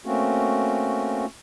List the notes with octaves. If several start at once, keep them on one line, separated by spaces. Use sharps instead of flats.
A3 A#3 C4 C#4 F#4